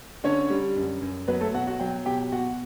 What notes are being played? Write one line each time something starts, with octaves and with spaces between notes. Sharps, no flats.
D3 C#4 C#5
G3
F#2
F#2
F#3 B3 B4
A3 A4
B2 F#4 F#5
F#4 F#5
F#3 G5
B2 G4 G5
B2 F#4 F#5